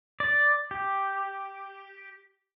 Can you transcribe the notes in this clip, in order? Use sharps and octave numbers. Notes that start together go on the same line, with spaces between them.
D5
G4